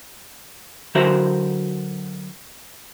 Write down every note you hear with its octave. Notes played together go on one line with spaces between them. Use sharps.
D3 F#3 F#4 A#4 C5 E5